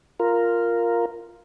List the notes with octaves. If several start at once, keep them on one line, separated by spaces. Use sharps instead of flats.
F4 A#4